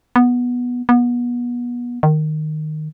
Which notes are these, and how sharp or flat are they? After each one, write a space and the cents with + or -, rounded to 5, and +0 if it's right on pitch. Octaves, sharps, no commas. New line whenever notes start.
B3 -10
B3 -30
D#3 -15